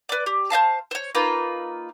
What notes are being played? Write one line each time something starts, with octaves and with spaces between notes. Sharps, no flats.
B4 D5
G4
C5 D#5 F5 A5
C5 C#5
A#3 D#4 F4 B4